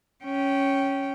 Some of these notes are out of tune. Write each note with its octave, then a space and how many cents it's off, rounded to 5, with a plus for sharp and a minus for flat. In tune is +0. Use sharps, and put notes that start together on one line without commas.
C#4 +0 G5 -15